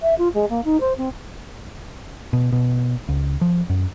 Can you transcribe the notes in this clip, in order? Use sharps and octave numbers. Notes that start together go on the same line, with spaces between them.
E5
F4
G#3
A#3
D#4
C5
C4
B2
B2
C#2
F3
F#2